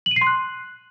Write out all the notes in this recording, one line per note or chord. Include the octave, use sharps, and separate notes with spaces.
F#7
D#7
C7
C6
F#6